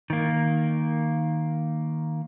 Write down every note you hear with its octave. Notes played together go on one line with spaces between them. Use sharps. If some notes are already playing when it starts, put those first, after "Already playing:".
D#3 A#3